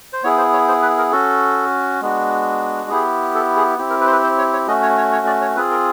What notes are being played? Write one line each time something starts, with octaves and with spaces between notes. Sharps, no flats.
C5
B3 E4 G#4 C#5
C5
C#5
C5
B4
A#4
C#4 F#4 A4
G#3 B3 D4 F#4
B3 E4 G4 G#4
A4
G#4
C4 E4 G4
A#4
B4
C5
B4
C5
C#5
C#5
A3 C#4 F#4 D#5
C#5
C#5
C#5
D5
C#5
C4 F4 G#4 B4
A#4